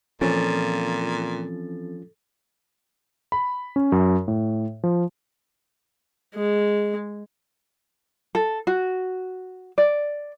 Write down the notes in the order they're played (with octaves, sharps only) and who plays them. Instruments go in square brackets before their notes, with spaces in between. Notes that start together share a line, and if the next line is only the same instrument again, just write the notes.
[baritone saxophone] A#2 [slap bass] E3 C4 [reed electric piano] F3 C#4 F4 [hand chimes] A4 A6
[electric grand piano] B5
C#4
F#2
A2
F3
[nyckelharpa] G#3
[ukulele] A4
F#4
D5